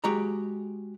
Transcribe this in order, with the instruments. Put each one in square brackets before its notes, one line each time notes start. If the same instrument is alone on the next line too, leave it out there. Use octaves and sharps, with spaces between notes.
[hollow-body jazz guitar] G#3 F#4 G4 G5 A#5